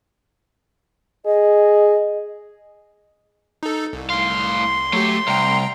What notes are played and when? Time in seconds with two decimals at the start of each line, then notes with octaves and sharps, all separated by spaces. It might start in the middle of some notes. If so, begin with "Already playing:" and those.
1.26 G#4 D#5
3.63 D#4 A4
3.93 C2
4.10 A2 F5 C6
4.93 F#3 A3 G4
5.28 C2 G5 A#5